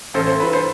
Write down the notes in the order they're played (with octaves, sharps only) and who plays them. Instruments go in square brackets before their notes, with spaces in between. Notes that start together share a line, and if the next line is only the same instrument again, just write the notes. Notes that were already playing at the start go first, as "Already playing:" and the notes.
[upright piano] A1 A4 C5
A4 C5
G2 E3 B4
A4 C5